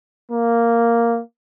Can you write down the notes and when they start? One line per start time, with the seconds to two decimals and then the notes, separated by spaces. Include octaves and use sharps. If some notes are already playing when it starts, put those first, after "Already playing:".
0.32 A#3